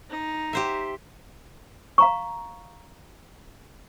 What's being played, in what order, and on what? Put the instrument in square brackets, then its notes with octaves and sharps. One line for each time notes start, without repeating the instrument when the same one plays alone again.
[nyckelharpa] D#4
[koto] G4 C5 E5
[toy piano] F5 A#5 C#6